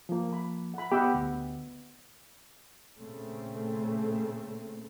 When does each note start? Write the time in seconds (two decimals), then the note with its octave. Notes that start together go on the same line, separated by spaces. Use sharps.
0.09 F3 A#3
0.33 B5
0.74 F#5 B5
0.92 B3 G4 D#5 F#5 B5 E6
1.14 D2
2.97 A#2 C#3 A3 C4